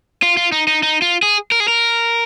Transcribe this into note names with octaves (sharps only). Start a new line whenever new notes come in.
F4
F4
D#4
D#4
D#4
F4
G#4
A#4
G#4
A#4